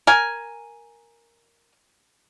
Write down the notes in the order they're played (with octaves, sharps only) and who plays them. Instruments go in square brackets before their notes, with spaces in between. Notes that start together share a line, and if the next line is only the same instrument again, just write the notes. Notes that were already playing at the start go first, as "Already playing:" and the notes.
[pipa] A#4 G#5